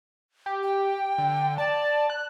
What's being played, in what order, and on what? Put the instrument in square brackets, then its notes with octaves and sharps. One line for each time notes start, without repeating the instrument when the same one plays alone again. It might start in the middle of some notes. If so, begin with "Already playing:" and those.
[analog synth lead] G4
[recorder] G5
[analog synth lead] D3
[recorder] D5 [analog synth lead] A5
[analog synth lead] F#6